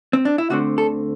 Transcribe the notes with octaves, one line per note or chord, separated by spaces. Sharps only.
C4
D4
E4
D2 D3 A3 C4 F#4
A4